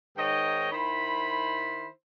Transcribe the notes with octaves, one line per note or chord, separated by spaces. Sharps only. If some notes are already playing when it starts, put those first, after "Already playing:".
G#2 D#3 C#5 D#5 G5
D#3 E4 C5 B5